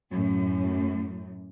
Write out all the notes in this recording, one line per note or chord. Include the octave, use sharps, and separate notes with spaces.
F#2 A2